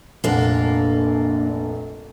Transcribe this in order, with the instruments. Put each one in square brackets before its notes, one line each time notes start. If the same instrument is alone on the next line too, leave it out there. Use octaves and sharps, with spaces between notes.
[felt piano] F1 A#1 F#5 [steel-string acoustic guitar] A#3 D4